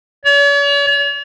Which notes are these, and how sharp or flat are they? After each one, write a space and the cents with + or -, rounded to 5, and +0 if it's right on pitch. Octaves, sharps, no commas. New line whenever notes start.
C#5 +45